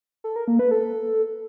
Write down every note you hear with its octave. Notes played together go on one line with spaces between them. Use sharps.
A4
A#4
A#3
B4
A4